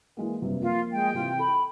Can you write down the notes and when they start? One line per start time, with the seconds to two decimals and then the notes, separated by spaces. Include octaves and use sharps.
0.17 E3 G#3 A#3
0.42 F#1 G2 C3
0.62 F3 A#3 F4
0.92 G#3 G5
1.14 C3 E3 F4
1.39 A4 B5